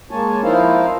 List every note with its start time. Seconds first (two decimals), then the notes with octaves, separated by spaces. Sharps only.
0.11 G#3 A#3 C#5 G#5 A5
0.44 F3 D#4 E4 A#4 C5 F5